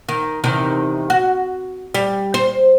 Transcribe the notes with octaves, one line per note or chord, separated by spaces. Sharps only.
D#3
E2 C3 D#3
F#4
G3
C5